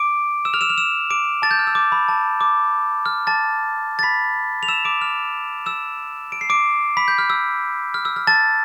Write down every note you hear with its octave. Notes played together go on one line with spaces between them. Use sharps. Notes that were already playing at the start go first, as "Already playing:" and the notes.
Already playing: D6 D7
E6 E7
F6 F7
E6 E7
F6 F7
E6 E7
D6 D7
A5 A6
G6
F6
E6
D6
B5
A5
D6
F6
A5 A6
A6
B5 B6
F7
E6 E7
D6 D7
F6 F7
E6 E7
D7
C7
D6 D7
B5 B6
G6
F6
E6
F6
E6
F6
A5 A6